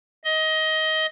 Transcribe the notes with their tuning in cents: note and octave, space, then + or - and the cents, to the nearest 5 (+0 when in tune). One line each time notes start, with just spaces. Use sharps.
D#5 +20